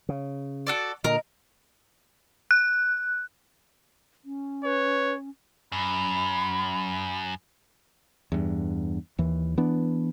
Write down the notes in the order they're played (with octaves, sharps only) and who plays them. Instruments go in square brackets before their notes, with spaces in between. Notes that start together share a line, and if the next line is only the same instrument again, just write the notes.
[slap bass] C#3
[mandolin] F#4 A4 D5
[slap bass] A#2 D3 [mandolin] A#4 [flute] D#5
[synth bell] F#6
[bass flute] C#4
[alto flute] B4 [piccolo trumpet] C#5
[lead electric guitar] F#2 [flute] B5
[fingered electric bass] E2 G2
D#2 E3
E3 B3 D4